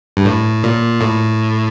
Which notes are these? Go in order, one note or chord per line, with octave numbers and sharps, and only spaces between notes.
G2
A2
A#2
A2